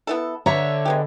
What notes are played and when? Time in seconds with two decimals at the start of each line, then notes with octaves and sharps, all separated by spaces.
0.07 B3 E4 A4
0.46 D3 C#5 E5 A#5
0.85 G#3 B3 G4